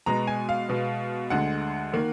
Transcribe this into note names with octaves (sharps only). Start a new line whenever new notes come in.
B2 G#3 B3 A#5
G#5
F5
B2 G#3 B3
D2 D3 G#3 F#5
D#3 A#3